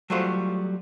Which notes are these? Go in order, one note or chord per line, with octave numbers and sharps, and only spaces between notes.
F#3 G3 A3 F4 F#4 C5